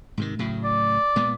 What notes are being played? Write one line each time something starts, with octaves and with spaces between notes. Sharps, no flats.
G#2 C3 D#3
A2 C#3 F#3
D5
A#2 G#3 B3